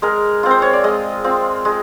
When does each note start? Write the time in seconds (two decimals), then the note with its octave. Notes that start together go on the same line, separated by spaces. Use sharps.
0.02 G#3 A#4
0.43 C4 F4
0.51 C5
0.62 C#5
0.73 D5
0.84 G#3 D#5
1.24 C4 F4
1.65 G#3